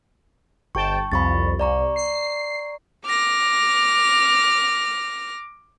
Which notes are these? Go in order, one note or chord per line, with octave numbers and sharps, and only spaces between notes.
G1 G5 A5 C#6
C2 F2 B5 C#6 A6
C2 D5 A#5 C#6
C7
D6 F6 A#6